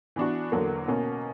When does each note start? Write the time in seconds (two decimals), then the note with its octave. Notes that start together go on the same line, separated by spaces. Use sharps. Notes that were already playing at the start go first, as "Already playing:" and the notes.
0.16 E3 B3 D4 F#4
0.52 E2 D3 F#3 A#3
0.87 B2 A#3 C#4